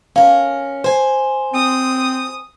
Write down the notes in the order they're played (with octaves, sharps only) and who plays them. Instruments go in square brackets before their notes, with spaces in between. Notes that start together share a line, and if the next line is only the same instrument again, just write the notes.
[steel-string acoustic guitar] C#4 A#4 [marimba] F5
[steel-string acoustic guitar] C5 G#5
[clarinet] C4 [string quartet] D#6